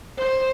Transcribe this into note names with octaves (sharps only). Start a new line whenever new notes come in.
C5